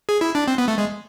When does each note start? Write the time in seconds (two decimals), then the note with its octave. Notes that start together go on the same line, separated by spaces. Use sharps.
0.09 G#4
0.21 E4
0.35 D4
0.48 C4
0.58 B3
0.68 A3
0.78 G#3